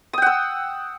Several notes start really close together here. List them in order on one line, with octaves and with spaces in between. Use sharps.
D#6 G5 F#5 E6